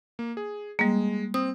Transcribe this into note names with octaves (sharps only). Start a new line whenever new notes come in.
A#3
G#4
G3 G#3 A#3
C4 D#6